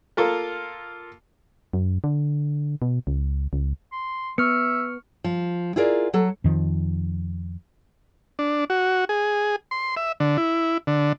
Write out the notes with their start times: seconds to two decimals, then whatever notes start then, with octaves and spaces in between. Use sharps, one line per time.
0.17 A#3 F4 A4 A#4
1.73 F#2
2.04 D3
2.82 B2
3.07 C#2
3.53 C#2
3.92 C6
4.38 B3 E5 C#6 F6 C#7
5.24 F3
5.76 E4 F4 G#4 A#4 D5
6.13 F#3 A4
6.44 F2 D#3 F3
8.39 D4
8.70 F#4
9.09 G#4
9.71 C6
9.97 E5
10.20 D3
10.38 E4
10.87 D3